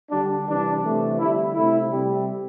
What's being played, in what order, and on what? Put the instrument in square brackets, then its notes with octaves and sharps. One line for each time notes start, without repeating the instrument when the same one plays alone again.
[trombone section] D3 G3 D4
C3 E3 G3 D4
C3 E3 A3
D3 G3 E4
C3 A3 E4
C3 G3